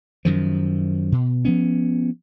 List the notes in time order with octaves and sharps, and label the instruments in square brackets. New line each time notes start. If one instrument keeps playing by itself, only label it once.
[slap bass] F#2 D#3 F3
B2
F3 B3 C#4